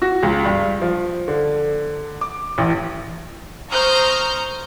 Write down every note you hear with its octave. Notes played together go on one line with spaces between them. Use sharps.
F#4
C#2
G2
F3
D3
D6
A1
C5 A#5 C#6 D#6 F6 G6